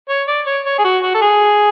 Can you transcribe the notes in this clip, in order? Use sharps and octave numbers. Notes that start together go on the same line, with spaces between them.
C#5
D5
C#5
C#5
G#4
F#4
F#4
A4
G#4